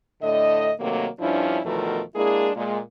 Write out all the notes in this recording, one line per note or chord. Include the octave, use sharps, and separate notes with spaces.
A2 D3 A3 D#5
C3 D#3 F#3 A3 A#3
G2 F3 C#4 D4 E4
E2 B2 D#3 F3 A3 A#4
G#3 A#3 D4 E4 G#4
A#2 G#3